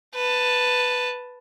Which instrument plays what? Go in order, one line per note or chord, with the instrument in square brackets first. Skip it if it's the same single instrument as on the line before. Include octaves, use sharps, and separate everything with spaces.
[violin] B4 A5